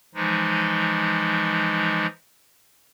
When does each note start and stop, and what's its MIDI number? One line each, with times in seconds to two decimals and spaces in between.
0.15 2.06 52
0.15 2.06 53
0.15 2.06 56
0.15 2.06 63